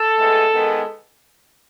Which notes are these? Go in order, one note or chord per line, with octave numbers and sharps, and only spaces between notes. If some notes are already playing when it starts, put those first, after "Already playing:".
Already playing: A4
A2 G#3 B3
D#3 G#3 B3